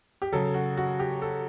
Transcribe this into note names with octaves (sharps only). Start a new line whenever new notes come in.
G4
C#3 F#3 A4
F#4
F#4
G4
A4